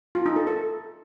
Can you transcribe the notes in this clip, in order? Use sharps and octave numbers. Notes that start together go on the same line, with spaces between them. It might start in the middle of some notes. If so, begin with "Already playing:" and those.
F4
D#4
A4
A4